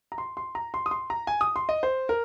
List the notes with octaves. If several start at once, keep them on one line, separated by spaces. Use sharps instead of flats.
A#5
C6
C6
A#5
C6
D#6
C6
A#5
G#5
D#6
C6
D#5
C5
A#4